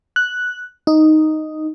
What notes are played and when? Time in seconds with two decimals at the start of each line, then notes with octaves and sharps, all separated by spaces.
0.16 F#6
0.87 D#4